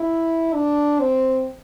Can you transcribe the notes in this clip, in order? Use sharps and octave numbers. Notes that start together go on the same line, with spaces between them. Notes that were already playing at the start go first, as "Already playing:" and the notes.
Already playing: E4
D4
C4